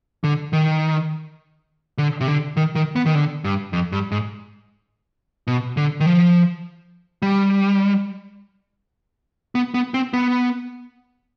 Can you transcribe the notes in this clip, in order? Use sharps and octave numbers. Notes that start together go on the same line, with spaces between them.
D3
D#3
D3
C3
D3
D#3
D#3
B3
D#3
D3
G2
F2
G2
G#2
B2
D3
D#3
F3
G3
B3
B3
C4
B3